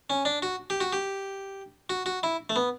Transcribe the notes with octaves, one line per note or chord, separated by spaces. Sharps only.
C#4
D4
F#4
G4
F#4
G4
F#4
F#4
E4
A3
B3